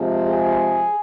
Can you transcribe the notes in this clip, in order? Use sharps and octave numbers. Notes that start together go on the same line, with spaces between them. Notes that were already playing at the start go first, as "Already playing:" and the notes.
Already playing: C3 F3 G#3
G#4